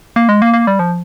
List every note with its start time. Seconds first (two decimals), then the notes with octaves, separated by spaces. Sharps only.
0.16 A#3
0.29 G#3
0.42 A#3
0.53 A#3
0.67 G3
0.79 F3